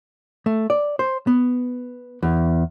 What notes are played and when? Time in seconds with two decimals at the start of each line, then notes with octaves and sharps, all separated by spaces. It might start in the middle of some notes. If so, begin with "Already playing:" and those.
0.46 A3
0.70 D5
0.99 C5
1.27 B3
2.22 E2